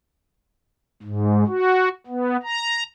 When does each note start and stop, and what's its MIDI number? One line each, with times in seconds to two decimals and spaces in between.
1.03 1.44 44
1.47 1.89 66
2.07 2.37 59
2.43 2.83 82